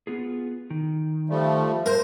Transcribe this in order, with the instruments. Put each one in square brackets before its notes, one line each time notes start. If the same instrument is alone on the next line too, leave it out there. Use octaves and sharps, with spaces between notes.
[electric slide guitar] B3 F4 G#4
D#3
[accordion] F3 G3 A3
[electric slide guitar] G2 [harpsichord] A#4 [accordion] C5